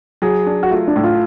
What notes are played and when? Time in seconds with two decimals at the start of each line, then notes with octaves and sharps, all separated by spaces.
0.22 F#3 G#4
0.47 D4
0.63 F#4
0.71 A3 F4
0.88 D4
0.96 A2
1.04 F4